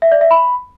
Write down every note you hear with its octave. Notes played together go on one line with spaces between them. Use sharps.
E5
D5
E5
B5